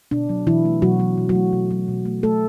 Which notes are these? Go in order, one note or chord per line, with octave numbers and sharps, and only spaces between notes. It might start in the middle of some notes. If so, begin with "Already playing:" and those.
B2 D4
F#3
B2 E3 E4
A3
B2 F#3 F#4
F#3
B2
F#3 F#4
A3
B2
F#3
B2
A3
B2 A3 A4